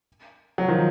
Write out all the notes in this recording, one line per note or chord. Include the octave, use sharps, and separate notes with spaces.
F#3
D#3 F3